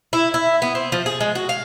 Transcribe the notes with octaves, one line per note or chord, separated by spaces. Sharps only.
E4
E4
B3
C4
F3
G#4
G#3
F#4
F5